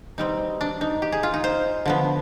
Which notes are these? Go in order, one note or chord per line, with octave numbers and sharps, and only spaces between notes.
B2 G3 C4 D#4
D4
D#4
G4
G#4
F4
D#4
C5
D3 F3 B3